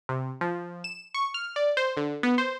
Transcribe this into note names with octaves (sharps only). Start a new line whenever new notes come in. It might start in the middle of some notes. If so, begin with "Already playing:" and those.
C3
F3
E7
C#6
F6
D5
C5
D3
B3
C5